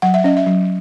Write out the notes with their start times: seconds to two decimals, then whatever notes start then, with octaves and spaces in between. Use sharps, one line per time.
0.02 F#3 F#5
0.14 E5
0.24 C#4 D#5
0.37 E5
0.47 F#3